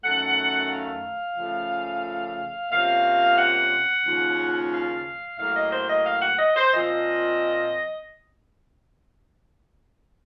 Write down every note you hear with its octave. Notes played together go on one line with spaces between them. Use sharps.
F#2 D#3 A3 F#5
F5
C#3 F3 A3
C3 F3 A#3 C#4 F5
F#5
D#2 C#3 F3
F5
A2 F#3 A#3 F5
D#5
C5
D#5
F5
F#5
D#5
C5
A#2 F3 C4 D#5